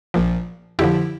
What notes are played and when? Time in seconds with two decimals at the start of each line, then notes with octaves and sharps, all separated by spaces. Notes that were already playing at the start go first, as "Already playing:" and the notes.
0.14 A#1 A#2 F3
0.79 F2 D3 F3 E4 G4